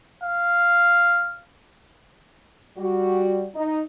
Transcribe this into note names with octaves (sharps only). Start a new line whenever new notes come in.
F5
G3 F#4
D#4